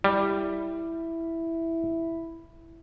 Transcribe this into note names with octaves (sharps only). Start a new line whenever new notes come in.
G3 E4